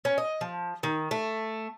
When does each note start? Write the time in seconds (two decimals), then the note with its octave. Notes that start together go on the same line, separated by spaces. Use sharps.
0.05 C#4
0.18 D#5
0.41 F3
0.83 D#3
1.11 A3